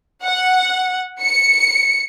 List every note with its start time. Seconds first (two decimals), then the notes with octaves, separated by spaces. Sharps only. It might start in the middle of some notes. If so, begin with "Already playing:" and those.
0.22 F#5
1.21 C#7